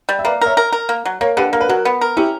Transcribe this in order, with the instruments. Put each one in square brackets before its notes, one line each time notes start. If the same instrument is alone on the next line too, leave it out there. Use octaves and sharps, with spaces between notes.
[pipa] G3
[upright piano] E5
[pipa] A#3 [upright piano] B4 D5
[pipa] A#4 [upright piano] C#5 E5
[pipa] A#4
A#4
A#3
F#3
[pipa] A#3 [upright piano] A#4 C#5
[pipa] D3 [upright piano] G4 B4
[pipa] A#3 [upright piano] A#4
[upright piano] B4
[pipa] F#3 [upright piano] F#4 A#4
[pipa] B3
A#4
[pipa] C#4 [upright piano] E4 G4